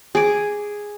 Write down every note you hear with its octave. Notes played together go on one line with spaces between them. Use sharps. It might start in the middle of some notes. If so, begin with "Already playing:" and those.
G#4 D6